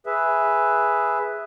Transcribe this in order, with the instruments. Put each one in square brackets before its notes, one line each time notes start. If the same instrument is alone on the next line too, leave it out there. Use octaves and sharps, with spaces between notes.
[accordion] G#4 B4 E5